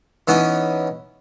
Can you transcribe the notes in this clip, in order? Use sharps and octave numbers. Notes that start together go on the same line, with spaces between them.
E3 B3 C#4 D#4